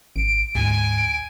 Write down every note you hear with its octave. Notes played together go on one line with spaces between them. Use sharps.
G#1 D7
D2 G#2 G#5